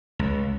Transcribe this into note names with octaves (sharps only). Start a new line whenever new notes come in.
C#2